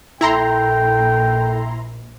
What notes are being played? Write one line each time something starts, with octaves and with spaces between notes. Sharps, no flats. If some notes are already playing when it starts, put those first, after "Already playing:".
A#1 A#2 E4 A4 G5 A#5 C6